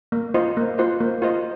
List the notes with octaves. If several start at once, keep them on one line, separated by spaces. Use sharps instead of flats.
A#3
F4 C5 D#5
A#3
F4 C5 D#5
A#3
F4 C5 D#5